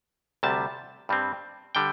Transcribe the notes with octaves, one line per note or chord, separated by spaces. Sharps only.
D2 C3 G3 A5
G2 G3 C4
D3 G3 G5